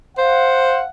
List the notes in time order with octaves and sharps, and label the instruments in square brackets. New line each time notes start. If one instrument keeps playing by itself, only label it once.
[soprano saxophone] C5 [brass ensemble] F5 F#5